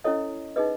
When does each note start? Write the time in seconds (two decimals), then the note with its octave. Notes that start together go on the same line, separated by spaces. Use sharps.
0.04 C#4 E4 A4 C#5 D#5
0.56 D#4 G#4 B4 D#5